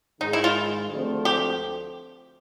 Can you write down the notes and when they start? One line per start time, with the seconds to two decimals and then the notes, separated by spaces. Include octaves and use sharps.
0.21 G#2 D#3 G#3 D#4
0.33 E4
0.44 F4
0.90 D2 D3 F3 A3 C4
1.25 G4